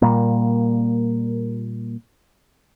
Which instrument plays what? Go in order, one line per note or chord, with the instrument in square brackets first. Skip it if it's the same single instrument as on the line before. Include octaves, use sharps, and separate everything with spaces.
[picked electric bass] A#2 G3 A#3